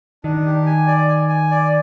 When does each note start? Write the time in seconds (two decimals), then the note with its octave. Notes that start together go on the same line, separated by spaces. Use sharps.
0.24 D#3 D4
0.45 G4
0.66 G#5
0.87 D5
1.09 G#5
1.29 G#5
1.51 D5